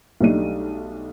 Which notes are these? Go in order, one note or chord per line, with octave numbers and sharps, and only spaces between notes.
B1 G3 A3 D4 D#4 D#7